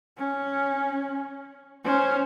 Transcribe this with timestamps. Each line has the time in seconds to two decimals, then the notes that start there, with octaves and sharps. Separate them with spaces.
0.18 C#4
1.84 C#4 C5